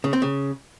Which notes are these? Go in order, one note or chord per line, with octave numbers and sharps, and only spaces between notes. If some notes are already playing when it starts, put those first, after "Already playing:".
C#3
C4
C#3